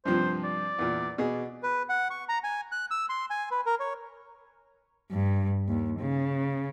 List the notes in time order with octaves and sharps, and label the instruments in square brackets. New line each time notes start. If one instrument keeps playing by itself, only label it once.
[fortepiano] G2 C3 F3 [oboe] C5
[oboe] D5
[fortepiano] E2 A#2
B2 G#4
[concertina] B4
F#5
C#6
A#5
G#5
F#6
E6
C6
G#5
B4
A#4
C#5
[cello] G2
D#2
C#3